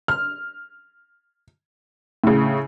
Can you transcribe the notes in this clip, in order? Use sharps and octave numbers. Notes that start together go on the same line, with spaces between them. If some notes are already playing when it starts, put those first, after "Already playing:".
F6
A2 C#3